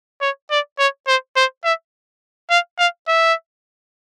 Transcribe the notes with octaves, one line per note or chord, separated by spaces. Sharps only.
C#5
D5
C#5
C5
C5
E5
F5
F5
E5